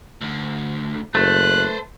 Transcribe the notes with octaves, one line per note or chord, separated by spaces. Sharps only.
D2 D3
F#1 A3 B4 C5 F#6